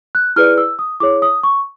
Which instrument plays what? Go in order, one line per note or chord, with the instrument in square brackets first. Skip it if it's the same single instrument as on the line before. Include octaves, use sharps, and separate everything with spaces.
[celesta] F#6
E4 G#4 B4 D5 F6
E6
D#6
E4 G#4 C#5 D6
D#6
C#6